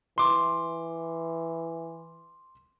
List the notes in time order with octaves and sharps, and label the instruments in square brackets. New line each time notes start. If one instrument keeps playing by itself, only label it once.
[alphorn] E3 [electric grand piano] C6 D6